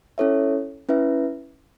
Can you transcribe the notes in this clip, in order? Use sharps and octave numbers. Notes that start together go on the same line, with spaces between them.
C#4 E4 A4 C#5 E5
C#4 E4 B4 E5